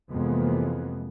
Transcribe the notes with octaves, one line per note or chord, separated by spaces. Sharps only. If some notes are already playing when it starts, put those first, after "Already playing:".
F2 C3 E3 G#3 A#3 B3